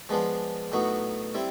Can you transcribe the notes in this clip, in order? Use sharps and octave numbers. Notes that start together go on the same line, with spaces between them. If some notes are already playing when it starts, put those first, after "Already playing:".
F3 G#3 B3 D4 F4
A2 F#3 B3 D#4 F#4
G3 C4 E4